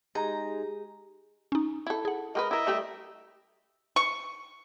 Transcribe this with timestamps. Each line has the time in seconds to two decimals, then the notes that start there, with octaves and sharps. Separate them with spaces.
0.15 G#3 D#4 G4 G#4 G#5 A#5
1.52 C#4 D#4
1.87 E4 A4
2.05 G#4 F#5
2.35 G#3 G4 A#4 B4 D#5
2.51 E4 A#4 D#5 E5
2.67 G3 A3 G4
3.96 C#6